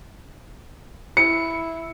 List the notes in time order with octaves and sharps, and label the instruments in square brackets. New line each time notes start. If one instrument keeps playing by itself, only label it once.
[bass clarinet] E4 [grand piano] C#7